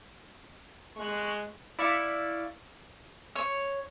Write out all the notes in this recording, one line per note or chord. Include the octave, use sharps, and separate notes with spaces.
G#3 C#6 F#6
E4 D5 F5 B5 C#6
C#5